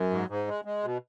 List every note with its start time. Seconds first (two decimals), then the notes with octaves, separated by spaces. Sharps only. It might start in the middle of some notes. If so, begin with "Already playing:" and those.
Already playing: F#2
0.10 G#2
0.28 G#2
0.47 G#3
0.65 G#3
0.83 B2